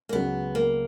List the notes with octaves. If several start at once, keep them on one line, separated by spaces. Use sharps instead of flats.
A#3
C#2 C#3 F#3 B3
A#3